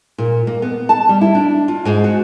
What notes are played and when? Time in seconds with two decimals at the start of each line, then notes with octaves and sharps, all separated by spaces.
0.18 A#2
0.47 A#3
0.62 B3
0.89 A5
1.09 G3
1.21 E4
1.35 D4
1.68 F4
1.85 G#2
2.04 F#4